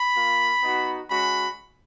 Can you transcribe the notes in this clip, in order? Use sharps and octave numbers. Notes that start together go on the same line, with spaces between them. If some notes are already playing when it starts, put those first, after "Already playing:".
Already playing: B5
A#3 F4
B3 D#4 F#4
G#3 C#4 F#4 B5